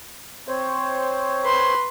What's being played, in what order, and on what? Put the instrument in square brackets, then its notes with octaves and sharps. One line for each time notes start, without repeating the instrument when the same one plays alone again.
[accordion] C4 C5 C#5
[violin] B4 C6